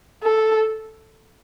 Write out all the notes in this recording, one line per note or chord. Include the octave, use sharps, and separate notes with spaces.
A4